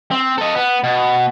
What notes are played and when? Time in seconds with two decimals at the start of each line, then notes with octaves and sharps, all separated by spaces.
0.11 C4
0.38 A4 D#5
0.55 B3
0.84 B2